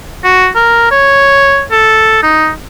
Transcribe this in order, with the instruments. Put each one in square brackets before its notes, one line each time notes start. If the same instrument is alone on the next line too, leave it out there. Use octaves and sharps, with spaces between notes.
[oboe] F#4
A#4
C#5
A4
D#4